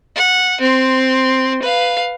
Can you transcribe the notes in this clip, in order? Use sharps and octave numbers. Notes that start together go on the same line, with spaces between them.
F#5
C4 C6
B4 F5